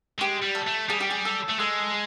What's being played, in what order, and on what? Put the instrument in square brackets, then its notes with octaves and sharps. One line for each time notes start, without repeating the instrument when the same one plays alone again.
[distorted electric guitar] G#3 [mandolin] G4
[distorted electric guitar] G3
[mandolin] A4
[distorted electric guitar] A3
[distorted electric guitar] G3 [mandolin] G#4
[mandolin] G4
G#4
A4
[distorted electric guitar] A3
[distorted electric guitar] G#3 [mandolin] A4